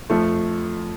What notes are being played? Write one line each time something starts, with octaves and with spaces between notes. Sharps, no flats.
F2 F3 A3